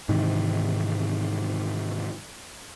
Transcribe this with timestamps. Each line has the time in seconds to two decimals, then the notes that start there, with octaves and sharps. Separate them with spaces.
0.09 G#2 C3 D#3 E3